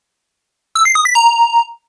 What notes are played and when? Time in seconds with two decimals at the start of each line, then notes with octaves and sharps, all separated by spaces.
0.75 E6
0.85 C7
0.95 D#6
1.05 B6
1.15 A#5